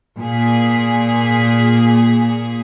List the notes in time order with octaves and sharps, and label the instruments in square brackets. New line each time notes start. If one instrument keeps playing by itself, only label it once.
[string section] A#2 G#4